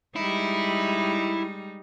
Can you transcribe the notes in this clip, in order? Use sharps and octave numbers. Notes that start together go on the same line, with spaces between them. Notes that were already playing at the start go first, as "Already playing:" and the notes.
G3 G#3 D#4 E4